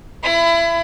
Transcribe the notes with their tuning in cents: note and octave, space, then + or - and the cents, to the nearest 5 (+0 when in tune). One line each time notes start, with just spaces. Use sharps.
E4 +30 B5 +25